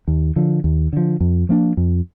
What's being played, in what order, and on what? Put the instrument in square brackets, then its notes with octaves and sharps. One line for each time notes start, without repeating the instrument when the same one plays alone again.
[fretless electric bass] D#2
D3 F3
D#2
D3 F3
F2
F3 A#3 D4
F2